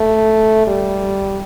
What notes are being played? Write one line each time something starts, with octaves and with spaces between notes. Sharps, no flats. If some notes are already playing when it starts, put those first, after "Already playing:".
Already playing: A3
G3